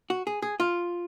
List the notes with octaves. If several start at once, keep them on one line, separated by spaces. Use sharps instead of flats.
F#4
G#4
G#4
F4